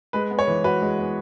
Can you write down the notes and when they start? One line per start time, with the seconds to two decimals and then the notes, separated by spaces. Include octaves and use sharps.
0.13 G#3 B4
0.31 B3
0.39 C#5
0.47 E3
0.64 F#4 B4
0.82 G#3
0.98 B3